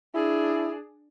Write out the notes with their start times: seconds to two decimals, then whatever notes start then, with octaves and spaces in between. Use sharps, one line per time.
0.15 D4 E4 G#4